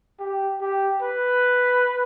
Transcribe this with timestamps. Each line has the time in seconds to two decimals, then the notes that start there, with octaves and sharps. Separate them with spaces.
0.19 G4
0.61 G4
1.02 B4